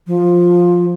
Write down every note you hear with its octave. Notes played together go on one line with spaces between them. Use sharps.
F3